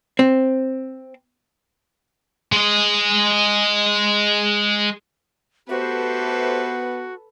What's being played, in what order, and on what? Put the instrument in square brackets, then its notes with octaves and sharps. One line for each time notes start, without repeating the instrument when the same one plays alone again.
[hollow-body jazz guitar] C4
[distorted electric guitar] G#3 D#5
[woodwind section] A3 G4 C5 [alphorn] B3 [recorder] F#4 [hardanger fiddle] A4 B4